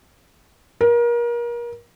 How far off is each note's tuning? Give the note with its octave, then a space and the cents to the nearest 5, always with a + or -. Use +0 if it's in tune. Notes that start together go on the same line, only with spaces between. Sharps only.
A#4 +30